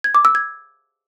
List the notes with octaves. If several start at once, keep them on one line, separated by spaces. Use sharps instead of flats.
G#6
D6
E6
G#6